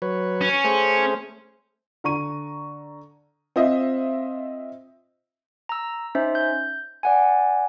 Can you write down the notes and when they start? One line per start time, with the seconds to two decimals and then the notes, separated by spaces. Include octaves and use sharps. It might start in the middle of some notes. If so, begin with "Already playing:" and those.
0.02 F#3 B4 C#5
0.42 C#4
0.64 A3 G#4 C5
2.04 D3 A#5 C#6 D#7
3.56 C4 F4 C5 D#5 E5
5.69 A#5 E6
6.15 C#4 D#4 C5 E5
6.35 G6
7.03 D5 F#5 G#5